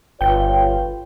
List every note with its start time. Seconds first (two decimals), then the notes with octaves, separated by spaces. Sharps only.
0.21 G1 F4 B4 C#5 G5